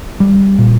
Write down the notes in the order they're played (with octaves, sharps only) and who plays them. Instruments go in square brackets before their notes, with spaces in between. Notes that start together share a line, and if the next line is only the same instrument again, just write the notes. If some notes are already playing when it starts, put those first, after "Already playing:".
[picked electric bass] G3
A#2